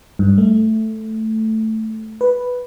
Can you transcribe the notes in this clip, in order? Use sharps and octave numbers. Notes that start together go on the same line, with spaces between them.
G2
A3
B4